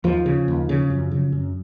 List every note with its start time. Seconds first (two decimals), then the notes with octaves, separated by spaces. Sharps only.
0.04 D#2 F3
0.26 C#3
0.48 D#2
0.69 C#3
0.90 F#2
1.11 C#3
1.32 F#2